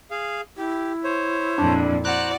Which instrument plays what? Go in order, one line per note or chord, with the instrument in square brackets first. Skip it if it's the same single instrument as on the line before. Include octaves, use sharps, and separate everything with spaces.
[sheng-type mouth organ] G#4 F5
[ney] E4 [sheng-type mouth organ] G4
[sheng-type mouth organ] C5 C#5
[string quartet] F2 A#2 [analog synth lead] D4
[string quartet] F#4 D5 [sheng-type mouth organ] C5 A#5 [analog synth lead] F#6